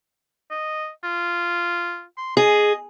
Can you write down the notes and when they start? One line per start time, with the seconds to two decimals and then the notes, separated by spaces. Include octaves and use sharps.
0.51 D#5
1.04 F4
2.17 C6
2.37 G#4 D#5